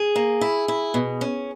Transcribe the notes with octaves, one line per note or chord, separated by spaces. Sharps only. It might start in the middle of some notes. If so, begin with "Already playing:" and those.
Already playing: G#4
A#3
E4
E4
B2
C#4